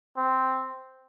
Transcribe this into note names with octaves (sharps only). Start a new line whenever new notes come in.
C4